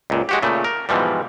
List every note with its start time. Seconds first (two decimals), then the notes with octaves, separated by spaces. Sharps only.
0.10 C#2 A#2
0.29 G#3 F#4 G4
0.42 A#2 C#3 A3
0.64 A#4
0.89 G#2 B2 E3 F3 G3